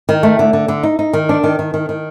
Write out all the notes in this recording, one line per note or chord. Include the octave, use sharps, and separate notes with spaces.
D#3
A3
D3
D3
D3
D#4
D#4
D#3
D4
D#3
D#3
D#3
D#3